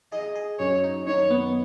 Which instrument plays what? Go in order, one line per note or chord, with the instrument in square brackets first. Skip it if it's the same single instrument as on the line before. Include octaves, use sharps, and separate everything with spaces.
[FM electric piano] G#4 [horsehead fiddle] D#5
[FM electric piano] G#4
[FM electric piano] F#2 [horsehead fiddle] C#5
[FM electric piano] D#4
[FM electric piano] D#3 [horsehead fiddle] C#5
[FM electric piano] B3